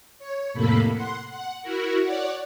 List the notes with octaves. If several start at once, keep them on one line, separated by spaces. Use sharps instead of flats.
C#5
F2 A2 C3 A#3 A4 B5
F#5 C6
F#5
E4 F#4 A#4
C#5 D5 F#5